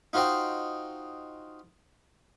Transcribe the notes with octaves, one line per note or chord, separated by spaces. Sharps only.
D#4 F4 F#4 C5 D#5 G5